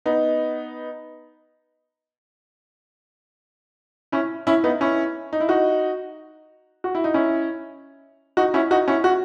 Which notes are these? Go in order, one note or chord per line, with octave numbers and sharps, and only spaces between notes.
B3 D#4
C#4 E4
C#4 E4
B3 D#4
C#4 E4
D#4
E4
D#4 F#4
F#4
E4
D#4
C#4 E4
D#4 F#4
C#4 E4
D#4 F#4
C#4 E4
F#4